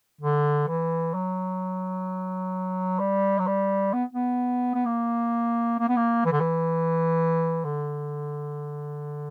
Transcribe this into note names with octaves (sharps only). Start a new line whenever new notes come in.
D3
E3
F#3
G3
F#3
G3
B3
B3
B3
A#3
A#3
B3
A#3
E3
D3
E3
D3